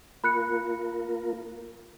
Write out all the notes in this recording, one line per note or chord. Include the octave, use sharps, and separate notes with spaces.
A#3 F4 A#4 B5 F#6 C#7